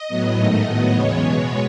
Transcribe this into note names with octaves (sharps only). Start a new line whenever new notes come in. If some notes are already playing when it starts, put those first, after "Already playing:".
Already playing: D#5
A2 F#3 B3
G#2 D#3 A3 D#5
A2 F#3 B3
E2 C#3 E3 G#3 B3 C#5
B2 G#3 B3